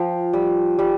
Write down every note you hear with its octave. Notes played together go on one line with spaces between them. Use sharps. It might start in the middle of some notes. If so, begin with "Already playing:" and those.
Already playing: F3 F5 G5
G3
G3